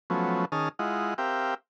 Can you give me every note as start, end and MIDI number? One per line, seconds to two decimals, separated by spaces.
0.10 0.45 53
0.10 0.45 54
0.10 0.45 57
0.10 0.45 59
0.10 0.45 61
0.52 0.69 51
0.52 0.69 61
0.52 0.69 68
0.52 0.69 81
0.52 0.69 87
0.52 0.69 89
0.79 1.14 56
0.79 1.14 64
0.79 1.14 65
0.79 1.14 75
0.79 1.14 78
1.18 1.54 60
1.18 1.54 67
1.18 1.54 70
1.18 1.54 76
1.18 1.54 77
1.18 1.54 79